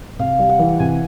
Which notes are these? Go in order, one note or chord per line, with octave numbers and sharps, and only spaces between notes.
C3 F5
G3
F#5
E3
C3 G#5